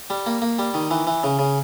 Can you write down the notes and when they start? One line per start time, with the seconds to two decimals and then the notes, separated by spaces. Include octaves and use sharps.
0.10 G3
0.26 A#3
0.42 A#3
0.59 G3
0.74 D#3
0.91 E3
1.07 E3
1.24 C#3
1.39 C#3